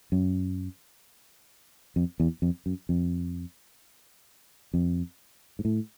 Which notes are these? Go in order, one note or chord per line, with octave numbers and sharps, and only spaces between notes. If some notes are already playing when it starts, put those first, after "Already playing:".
F#2
F2
E2
F2
F#2
F2
F2
G#2
A2